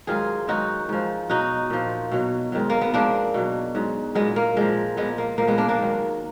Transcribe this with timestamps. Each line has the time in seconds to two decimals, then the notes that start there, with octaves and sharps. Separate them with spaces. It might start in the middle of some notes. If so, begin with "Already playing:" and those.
0.07 G#2 D#3 F#3 F4 G#4
0.47 G#2 D#3 F#3 D#4 F#4
0.89 G#2 F3
1.29 B2 F#3 D#4 F#4
1.70 A#2 F3
2.11 B2 F#3
2.52 G#2 D#3 F#3
2.70 A#3
2.81 B3
2.93 G#2 F3 A#3 D4
3.34 B2 F#3
3.75 G#2 F#3
4.15 A#2 F#3 G#3 B3
4.36 A#3
4.56 A#2 F3 G#3
4.97 A#2 F3 G#3 B3
5.18 A#3
5.38 A#2 F3 A#3
5.48 G#3 B3
5.58 A#3 D4
5.69 A#3 D4
5.78 G#2 D#3 F#3